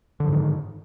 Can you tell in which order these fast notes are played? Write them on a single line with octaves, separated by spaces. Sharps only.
D3 F3 G#2 D#3